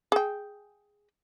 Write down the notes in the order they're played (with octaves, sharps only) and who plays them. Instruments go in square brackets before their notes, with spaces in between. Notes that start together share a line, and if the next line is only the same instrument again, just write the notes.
[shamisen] G#4 G5